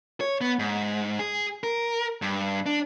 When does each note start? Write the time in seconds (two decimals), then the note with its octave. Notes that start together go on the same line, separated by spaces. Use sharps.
0.21 C#5
0.41 B3
0.59 G#2
1.19 G#4
1.64 A#4
2.22 G2
2.66 D4